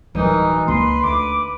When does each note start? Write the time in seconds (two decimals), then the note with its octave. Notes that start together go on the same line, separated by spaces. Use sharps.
0.15 D1 B2 E3 F#3 G3 D#4 A#4
0.68 C#2 D3 A#3 B4 C6
1.03 D2 D6